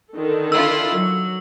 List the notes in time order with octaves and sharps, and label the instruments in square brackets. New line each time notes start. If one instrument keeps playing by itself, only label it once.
[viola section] D3 D#3 A4
[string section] D4 E4 F4 [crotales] E6
[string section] F#3